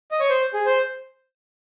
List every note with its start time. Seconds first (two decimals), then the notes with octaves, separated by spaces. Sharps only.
0.11 D#5
0.20 C#5
0.29 C5
0.54 G#4
0.66 C5